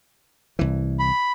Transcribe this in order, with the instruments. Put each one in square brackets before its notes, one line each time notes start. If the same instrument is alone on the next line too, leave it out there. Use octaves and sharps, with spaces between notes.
[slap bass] C2 E3
[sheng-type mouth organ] B5